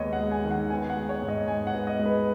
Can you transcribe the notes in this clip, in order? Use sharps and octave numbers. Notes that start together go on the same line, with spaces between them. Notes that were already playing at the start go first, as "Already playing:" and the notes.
Already playing: D#2 D#3 G#3 B3 C#5 D#5
F#5
G#3
G#5
D#3
F#5
B3 G#5
F#5
G#3
C#5
G#2
D#5
G#2 G#5
F#5
B3
D#5
G#3
B4